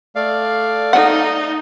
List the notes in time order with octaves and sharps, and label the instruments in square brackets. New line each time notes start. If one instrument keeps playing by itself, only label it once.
[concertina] A3 D5 F5
[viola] D#4 [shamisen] F#5